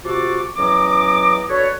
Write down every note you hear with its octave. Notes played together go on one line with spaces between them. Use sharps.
C3 F4 F#4 A4 C#6 D6
E2 F#3 C#4 D#5 D6
D4 F#4 A4 B4 C#5